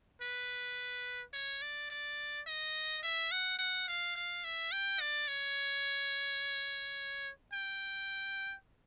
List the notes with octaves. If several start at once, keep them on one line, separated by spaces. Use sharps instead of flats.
B4
C#5
D5
D5
D#5
E5
F#5
F#5
F5
F5
E5
G5
D5
C#5
G5